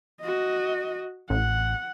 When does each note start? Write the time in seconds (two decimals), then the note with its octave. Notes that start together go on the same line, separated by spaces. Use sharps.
0.21 F#4 D#5
1.30 A1 F#5